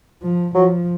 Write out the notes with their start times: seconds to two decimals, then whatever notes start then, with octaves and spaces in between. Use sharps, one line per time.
0.22 F3
0.55 F3 F#3